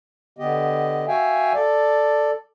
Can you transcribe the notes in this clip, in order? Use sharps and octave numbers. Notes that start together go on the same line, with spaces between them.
D3 B3 G4 D#5
F#4 E5 F5 G5 G#5
A4 D5